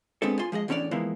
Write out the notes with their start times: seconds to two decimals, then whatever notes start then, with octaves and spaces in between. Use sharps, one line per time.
0.22 G#3 B3 C4 D4 A4
0.39 F4 G#5 C6
0.52 F3 G#3 G#4 D#5
0.68 E2 A2 C#4 D4 C#5 D5
0.91 E3 F3 G#3 A#3 B3 E4